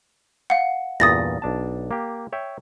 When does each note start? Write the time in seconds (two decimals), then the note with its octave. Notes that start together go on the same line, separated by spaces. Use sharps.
0.50 F5 F#5
1.00 E2 G2 A#2 D#6 A6 A#6
1.42 B1 D4 A5
1.91 A#3 G4
2.33 C#5 E5 G5